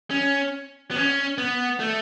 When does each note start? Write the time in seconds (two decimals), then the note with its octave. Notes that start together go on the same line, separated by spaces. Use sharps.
0.11 C#4
0.91 B3
0.96 C#4
1.38 B3
1.80 A3